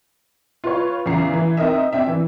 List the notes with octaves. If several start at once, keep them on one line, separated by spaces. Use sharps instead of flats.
F4 B4 C#5
E2 C#3 A#5 C7
E3
C4 D#4 A#4 D#5 E5
C4 D4 E5
E3